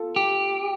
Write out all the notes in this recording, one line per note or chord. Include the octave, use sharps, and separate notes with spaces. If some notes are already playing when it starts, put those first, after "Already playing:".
Already playing: F4 A4
G4